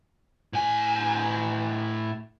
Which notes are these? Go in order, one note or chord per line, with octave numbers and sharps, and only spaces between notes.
A2 G#5